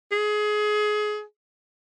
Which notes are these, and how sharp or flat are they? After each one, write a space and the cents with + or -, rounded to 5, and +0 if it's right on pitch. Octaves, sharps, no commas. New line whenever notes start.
G#4 +25